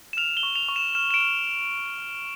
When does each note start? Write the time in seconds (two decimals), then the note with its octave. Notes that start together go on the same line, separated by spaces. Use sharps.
0.13 E7
0.17 F6 F7
0.37 G7
0.43 C#6
0.55 F7
0.69 C#6
0.76 E7
0.95 F6 E7
1.11 E7
1.14 D7
1.21 F6